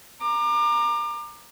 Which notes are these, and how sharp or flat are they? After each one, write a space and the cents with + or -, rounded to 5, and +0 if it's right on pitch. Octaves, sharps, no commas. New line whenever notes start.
A#5 +0 D6 +30